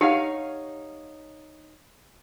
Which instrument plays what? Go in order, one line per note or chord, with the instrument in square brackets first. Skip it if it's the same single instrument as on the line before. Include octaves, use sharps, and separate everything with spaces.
[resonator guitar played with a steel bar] D#4 C#5 F5 [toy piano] G4 F#5